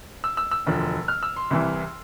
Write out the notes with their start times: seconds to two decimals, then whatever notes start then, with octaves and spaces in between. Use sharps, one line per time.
0.24 E6
0.37 E6
0.51 E6
0.66 E1 D2 D3 F3
1.08 F6
1.23 E6
1.36 C6
1.51 C2 C3 E3